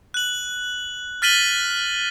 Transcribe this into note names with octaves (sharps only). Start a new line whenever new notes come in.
F#6 F#7
F6 A6 B6 D#7 F#7 G7